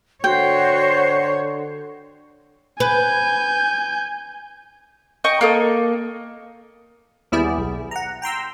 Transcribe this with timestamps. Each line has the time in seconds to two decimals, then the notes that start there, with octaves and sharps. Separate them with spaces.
0.24 D3 F#4 C5 C#5 G5
2.80 B4 G#5 G6
5.24 D#5 G5 C#6
5.41 A#3 A4 D#5
7.32 D#2 G3 B3 E4 G#4 D5
7.58 B1
7.91 F#5 A#5
8.22 G5 A#5 C6 E6